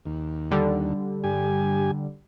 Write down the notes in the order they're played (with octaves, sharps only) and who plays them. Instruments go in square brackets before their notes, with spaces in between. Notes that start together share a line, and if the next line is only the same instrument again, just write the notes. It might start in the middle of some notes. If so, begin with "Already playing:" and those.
[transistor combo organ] D#2
[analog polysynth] D3 G3
[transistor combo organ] G2 G4 G#5